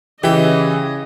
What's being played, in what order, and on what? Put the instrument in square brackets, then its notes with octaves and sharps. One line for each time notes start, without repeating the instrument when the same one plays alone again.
[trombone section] C#3 [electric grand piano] E3 E5 [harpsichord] G4 [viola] D#5